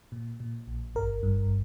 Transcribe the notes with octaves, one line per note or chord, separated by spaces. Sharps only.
A#2
A#2
A#1
G1 A#4
G2